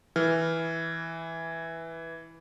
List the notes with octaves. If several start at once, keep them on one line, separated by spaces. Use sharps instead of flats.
E3 F6